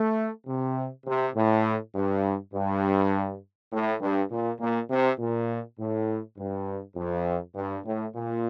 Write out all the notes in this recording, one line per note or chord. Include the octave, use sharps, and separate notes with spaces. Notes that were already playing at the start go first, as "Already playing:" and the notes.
Already playing: A3
C3
C3
A2
G2
G2
A2
G2
A#2
A#2
C3
A#2
A2
G2
F2
G2
A2
A#2